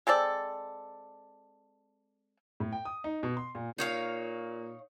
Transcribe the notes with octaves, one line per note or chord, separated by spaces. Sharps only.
G#3 C4 A4 D5
A2
G5
D#6
D#4
B2
C6
A#2
A#2 D#4 C#5 F5